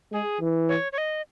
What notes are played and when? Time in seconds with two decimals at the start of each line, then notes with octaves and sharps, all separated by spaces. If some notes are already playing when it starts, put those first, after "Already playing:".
0.12 G#3 G#4
0.41 E3
0.69 C#5
0.92 C#5
0.98 D#5